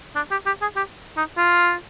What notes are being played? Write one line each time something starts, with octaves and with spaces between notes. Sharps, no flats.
D4
G4
G4
G#4
G4
D#4
F4